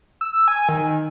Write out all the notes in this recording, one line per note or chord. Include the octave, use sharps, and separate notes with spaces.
E6
G#5
D#3